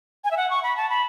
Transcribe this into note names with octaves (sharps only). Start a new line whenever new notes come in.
G#5
E5
F#5
C#6
B5
A5
B5